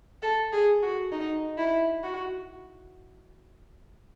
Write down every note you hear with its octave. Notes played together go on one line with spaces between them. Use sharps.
A4
G#4
F#4
D#4
E4
F#4